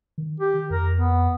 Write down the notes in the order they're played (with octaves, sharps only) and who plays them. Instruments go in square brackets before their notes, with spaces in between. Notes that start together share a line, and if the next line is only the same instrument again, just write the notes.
[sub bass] D#3
[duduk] G4
[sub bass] F2 [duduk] A#4
[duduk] B3